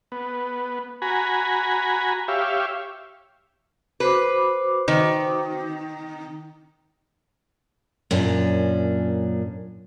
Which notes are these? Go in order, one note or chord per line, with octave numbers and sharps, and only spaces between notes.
B3
F#4 G#5 A#5 B5
G4 C#5 E5 F5
F#4 B4 C5 D6
D#3
F#2 A#2 C#4 D4